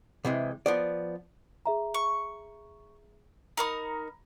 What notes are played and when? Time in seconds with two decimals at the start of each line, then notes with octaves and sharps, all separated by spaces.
0.25 C3 E3 G#3
0.66 F3 B3 D5
1.66 G#4 E5 A#5
1.94 C#6
3.57 D#4 A#4 A#5 B5 D#6